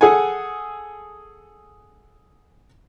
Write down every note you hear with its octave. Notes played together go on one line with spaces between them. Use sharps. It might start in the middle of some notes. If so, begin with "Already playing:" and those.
G#4 A4 F#5 G#5